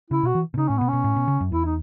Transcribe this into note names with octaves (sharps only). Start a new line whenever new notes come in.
C#3 E4
B2 F#4
E3
B2
C#3 D#4
A2 C#4
B2 B3
B2 C#4
A2
B2
C#3
F#2
E2 E4
D#4